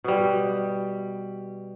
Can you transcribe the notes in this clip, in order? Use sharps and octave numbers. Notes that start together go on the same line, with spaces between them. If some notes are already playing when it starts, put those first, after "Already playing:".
B2 G3